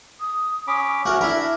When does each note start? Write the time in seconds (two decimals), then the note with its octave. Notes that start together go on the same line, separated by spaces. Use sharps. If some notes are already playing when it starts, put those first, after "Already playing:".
0.20 D#6
0.67 C#4 B5 D6
1.05 C#4 F#4 A#4 E5
1.21 D4 E4 A#4 B5